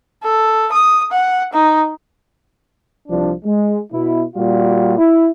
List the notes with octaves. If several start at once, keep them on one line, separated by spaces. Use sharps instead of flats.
A4
D#6
F#5
D#4
C2 F3 D4
G#3
B2 E4
A#2 G3 F4 F#4
E4